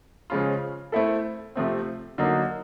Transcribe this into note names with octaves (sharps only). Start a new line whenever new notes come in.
C#3 F3 G#3 C#4 F4
A3 C4 E4 A4
C3 F3 A3 C4
D3 F#3 A#3 D#4